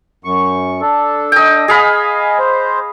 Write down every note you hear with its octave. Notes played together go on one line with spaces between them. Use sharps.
F#2 C#6
D4 A4
D#5 G5
G#4 D#5 F5 G#5 B5
C5